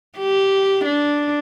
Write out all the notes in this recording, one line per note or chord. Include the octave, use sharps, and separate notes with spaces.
G4
D4